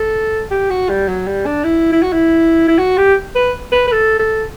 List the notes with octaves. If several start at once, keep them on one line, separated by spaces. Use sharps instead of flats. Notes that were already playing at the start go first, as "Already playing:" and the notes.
Already playing: A4
G4
F#4
G3
F#3
G3
D4
E4
E4
F#4
E4
E4
F#4
G4
B4
B4
B4
A4
A4